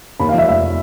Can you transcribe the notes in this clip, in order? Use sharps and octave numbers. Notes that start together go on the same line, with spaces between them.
D#2 B5
F5
F3 E5
F1 E5